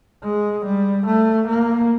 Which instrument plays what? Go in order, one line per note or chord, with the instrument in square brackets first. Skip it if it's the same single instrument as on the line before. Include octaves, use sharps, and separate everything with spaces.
[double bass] G#3
G3
A3
A#3